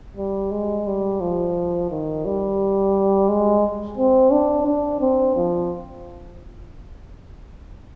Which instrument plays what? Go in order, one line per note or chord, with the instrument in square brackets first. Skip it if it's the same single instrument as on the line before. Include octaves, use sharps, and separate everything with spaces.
[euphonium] G3
G#3
G3
F3
D#3
G3
G#3
C4
D4
D4
C4
F3